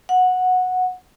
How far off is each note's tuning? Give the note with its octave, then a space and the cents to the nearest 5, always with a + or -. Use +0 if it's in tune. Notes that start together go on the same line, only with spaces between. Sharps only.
F#5 -10